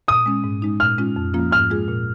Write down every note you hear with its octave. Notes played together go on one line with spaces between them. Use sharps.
A#2 D#6
G#3 C#4
G#2
G#3 D#4
A#2 F6
G#3 C#4 F4
F2
F3 A#3 C#4 F4
G#2 F6
G#3 F4 G#4
A#2